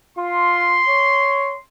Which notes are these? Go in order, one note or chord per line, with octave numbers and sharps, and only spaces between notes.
F4 C6
C#5